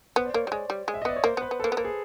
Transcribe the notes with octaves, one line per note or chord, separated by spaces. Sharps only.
B3 C5
D5
A#3 C#5
G3
G#3 D5
G3
G#3
E5
D#5
B3 D5
C#5
A#3 C5
B3 B4
B3
A#3 A4
B3
A#3 A4
G#4